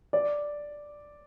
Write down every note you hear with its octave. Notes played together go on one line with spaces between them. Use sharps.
D5